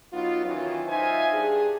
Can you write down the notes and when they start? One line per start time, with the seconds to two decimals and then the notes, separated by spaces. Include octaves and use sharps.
0.12 F#3 B3 D#4 F4
0.45 D#3 E3 F#3 C#4 F4
0.87 D#4 F4 C5 E5 G#5
1.33 G2 D4 G#4